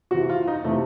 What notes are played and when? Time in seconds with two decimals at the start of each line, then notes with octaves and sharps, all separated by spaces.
0.11 C3 E3 F#4
0.30 F4
0.47 D#4
0.64 C3 E3 A3